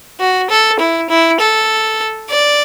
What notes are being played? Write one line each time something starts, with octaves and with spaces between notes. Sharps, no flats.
F#4
A4
E4
E4
A4
D5